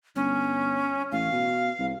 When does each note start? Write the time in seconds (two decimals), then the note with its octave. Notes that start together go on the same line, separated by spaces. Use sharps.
0.16 G1 C#4
1.12 A1 F5
1.32 B2
1.79 C2